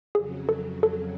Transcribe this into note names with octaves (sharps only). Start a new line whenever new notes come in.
F2 C#3 F#3 G#4
A4
A4